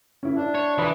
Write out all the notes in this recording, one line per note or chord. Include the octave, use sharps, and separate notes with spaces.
C#4 E4
D4 E4
C#5
E3 B5 D#6